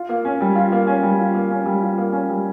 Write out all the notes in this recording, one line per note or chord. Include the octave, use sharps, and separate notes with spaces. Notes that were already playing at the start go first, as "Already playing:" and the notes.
Already playing: F4
A#3
C#4
G3
F4
A#3
C#4
G3
F4
A#3
C#4
G3
F4
A#3
C#4
G3